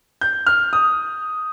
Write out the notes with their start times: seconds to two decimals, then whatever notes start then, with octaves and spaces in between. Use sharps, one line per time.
0.21 G6
0.46 F6
0.73 D#6